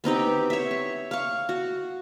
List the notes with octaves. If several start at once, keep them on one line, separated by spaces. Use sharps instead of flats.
B3 C4 D#4 G4
C#5 E5
C#6
F5 C#6
F#4